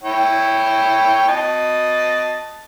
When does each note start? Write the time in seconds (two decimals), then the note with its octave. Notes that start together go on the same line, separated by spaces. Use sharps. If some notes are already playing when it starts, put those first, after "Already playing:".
0.03 E4 C#5 G5
1.28 D#5 A5